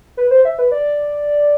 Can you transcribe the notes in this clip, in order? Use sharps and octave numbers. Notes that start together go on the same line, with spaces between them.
B4
C5
E5
B4
D5